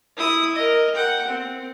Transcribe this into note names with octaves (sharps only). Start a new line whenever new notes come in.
E4 D#6
A#4 D#5
F#5 G5
C4